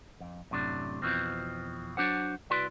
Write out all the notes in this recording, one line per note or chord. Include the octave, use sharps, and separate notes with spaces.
F2
F#2 A2 C3 D4
F2 B2 E3 F3 C4
F#3 D4 F#4 C5 F#5
C2 E4 F#4 B4 D5 C6